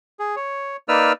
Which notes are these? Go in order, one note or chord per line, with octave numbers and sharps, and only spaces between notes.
G#4
C#5
A#3 D#4 B4 D5 E6 F6